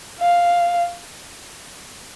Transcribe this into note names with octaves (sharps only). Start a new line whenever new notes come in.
F5